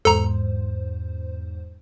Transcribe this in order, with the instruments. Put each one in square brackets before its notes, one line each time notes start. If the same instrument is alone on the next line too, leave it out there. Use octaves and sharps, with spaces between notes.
[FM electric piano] E2 G#2 C5 [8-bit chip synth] A4 A#5